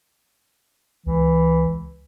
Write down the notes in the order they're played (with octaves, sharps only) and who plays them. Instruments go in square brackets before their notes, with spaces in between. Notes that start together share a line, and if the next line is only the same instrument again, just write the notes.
[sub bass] C#2 [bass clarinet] E3